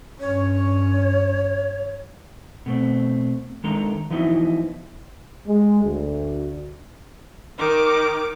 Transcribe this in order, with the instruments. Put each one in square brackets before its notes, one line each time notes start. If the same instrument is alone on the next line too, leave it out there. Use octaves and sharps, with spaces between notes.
[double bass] G2 C#4 [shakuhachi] C#5
[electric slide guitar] B2 A3 C4
D#3 G#3 D4 A4 A#5
E3 F3 B3 D#4 E4 F#4
[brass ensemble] G#3
D2
[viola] D#3 D6